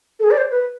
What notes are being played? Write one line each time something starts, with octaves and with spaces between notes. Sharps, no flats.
A4
G#4
D5
C5
B4